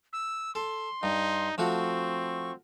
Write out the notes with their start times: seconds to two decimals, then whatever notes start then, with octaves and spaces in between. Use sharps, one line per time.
0.13 E6
0.55 A4 C6
1.03 G2 D#4
1.58 F3 A3 C4 F#4 C#6